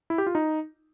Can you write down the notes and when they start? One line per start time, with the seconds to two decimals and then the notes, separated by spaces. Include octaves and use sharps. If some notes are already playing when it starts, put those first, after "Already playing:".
0.10 E4
0.18 G4
0.27 F4
0.35 D#4